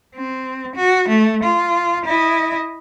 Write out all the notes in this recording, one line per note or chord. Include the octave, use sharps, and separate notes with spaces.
C4
F#4
A3
F4
E4 D#5